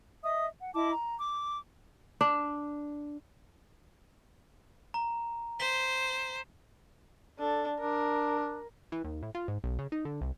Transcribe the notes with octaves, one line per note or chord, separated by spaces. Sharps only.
D#5 E5 D#6
F#5
E4 D#5 A5 D6
A#5
D6
D4
A#5
C5 B6 G7
D4 A4
D4 A#4
E3
D#2
A2
F4
G#2
B1
C#3
D#4
D3
C2